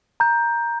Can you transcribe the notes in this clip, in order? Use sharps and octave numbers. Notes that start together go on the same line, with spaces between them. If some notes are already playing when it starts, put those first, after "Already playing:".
A#5 G6